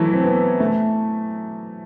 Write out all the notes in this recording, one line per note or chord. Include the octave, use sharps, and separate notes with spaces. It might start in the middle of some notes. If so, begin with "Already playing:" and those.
Already playing: E3 F#3 A3 E4 A4
C4
B3
A3